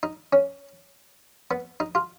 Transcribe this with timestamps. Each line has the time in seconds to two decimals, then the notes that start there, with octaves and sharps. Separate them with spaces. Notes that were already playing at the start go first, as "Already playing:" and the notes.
0.03 D#4
0.33 C#4
1.51 B3
1.80 D#4
1.95 F4